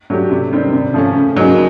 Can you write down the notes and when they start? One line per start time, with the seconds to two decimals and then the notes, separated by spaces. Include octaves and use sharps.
0.10 F#3 A3 D4 G4
0.31 C3
0.52 D#3 G3 C4
0.73 C3
0.94 F3 A3 C#4
1.15 C#3
1.36 F#3 A#3 D#4 G#4